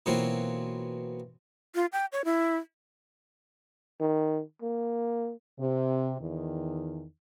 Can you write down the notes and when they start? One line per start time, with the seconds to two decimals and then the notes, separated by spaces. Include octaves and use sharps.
0.06 B2 E3 F#3 A#3 C4 F4
1.75 F4
1.93 G5
2.12 C#5
2.25 E4
4.01 D#3
4.62 A#3
5.60 C3
6.21 E2 D#3